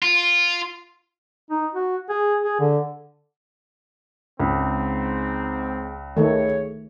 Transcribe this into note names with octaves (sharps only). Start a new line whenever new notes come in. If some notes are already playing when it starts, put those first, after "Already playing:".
F4
D#4
F#4
G#4
G#4
D3
C#2 G#2 G#3 C4
D#3 A3 G#4 C#5